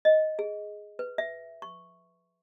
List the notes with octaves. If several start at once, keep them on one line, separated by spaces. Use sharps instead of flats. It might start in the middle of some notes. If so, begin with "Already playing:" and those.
D#5
G#4
B4
E5
C#6